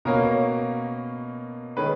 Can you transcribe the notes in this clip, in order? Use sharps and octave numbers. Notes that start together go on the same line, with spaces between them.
B2 A#3 C#4 A#4 A#5
D#3 G#3 C#4 B4 B5